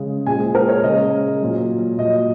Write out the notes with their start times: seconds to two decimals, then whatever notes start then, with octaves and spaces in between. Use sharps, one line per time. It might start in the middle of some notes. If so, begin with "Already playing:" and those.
Already playing: C#3 G#3
0.26 A#2 G#3 G#5
0.40 G#4
0.55 A#4
0.69 C#5
0.83 C#3 G#3 D#5
1.41 A#2 F#3
1.98 A#2 F#3 D#5